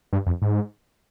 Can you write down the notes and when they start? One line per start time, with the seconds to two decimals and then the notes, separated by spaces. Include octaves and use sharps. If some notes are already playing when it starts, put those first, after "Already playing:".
0.13 G2
0.26 F2
0.42 G#2